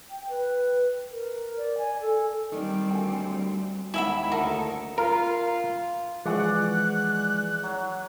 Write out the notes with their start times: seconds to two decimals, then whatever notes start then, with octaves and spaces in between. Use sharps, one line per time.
0.11 G5
0.29 B4
1.12 A#4
1.57 D5
1.78 G#5
2.01 A4
2.52 D#3 G3 C4
2.91 D2 G5 G#5
3.94 D#2 G#3 E4 E5 F#5 G#5 B5
4.32 D2 A4 A#4 F#5 A5
4.98 F4 A#4
6.26 E3 F3 G#3 G#4 D5 F#5 C#6 F#6
7.63 F#3